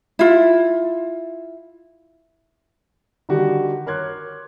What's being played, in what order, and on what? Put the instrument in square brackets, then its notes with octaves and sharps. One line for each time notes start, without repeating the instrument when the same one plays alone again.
[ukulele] E4 F4
[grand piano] D3 D#3 G3 F#4 G4
A#4 C#5 C6 D6 F#6 G#6